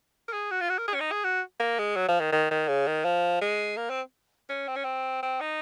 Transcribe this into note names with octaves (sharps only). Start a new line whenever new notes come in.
A#4
G#4
F#4
F4
F#4
A#4
G#4
C#4
D#4
G#4
F#4
A#3
G#3
F#3
F3
D#3
D#3
D#3
C#3
D#3
F3
G#3
A#3
C4
C#4
C4
C#4
C4
C4
D#4